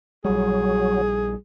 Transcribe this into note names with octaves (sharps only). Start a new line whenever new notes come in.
A#1 F#3 G3 G#4